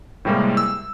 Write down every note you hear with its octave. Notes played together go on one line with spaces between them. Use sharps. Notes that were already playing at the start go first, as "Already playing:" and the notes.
A2 C3 G3 G#3 A#3
E6